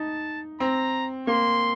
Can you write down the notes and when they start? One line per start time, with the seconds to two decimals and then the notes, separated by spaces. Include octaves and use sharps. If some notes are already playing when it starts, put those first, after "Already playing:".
Already playing: D#4 A5
0.60 C4 A#5
1.27 A#3 C6